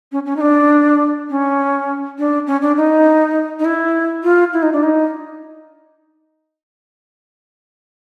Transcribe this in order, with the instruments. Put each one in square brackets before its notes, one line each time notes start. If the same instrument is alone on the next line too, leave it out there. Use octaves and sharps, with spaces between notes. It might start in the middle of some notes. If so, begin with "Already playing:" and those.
[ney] C#4
C#4
D#4
D4
C#4
D4
C#4
D4
D#4
D#4
E4
F4
E4
D#4
D4
D#4